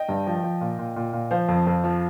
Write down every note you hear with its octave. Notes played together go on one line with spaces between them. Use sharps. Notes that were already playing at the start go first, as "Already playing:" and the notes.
Already playing: D#5 G5
G2
F3
F3
A#2
A#2
A#2
A#2
F3 C5 F5
F2
F2
F3